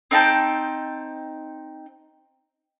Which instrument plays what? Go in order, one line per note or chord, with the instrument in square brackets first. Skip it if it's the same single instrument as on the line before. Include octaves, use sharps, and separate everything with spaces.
[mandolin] C4 D#4 G5 A5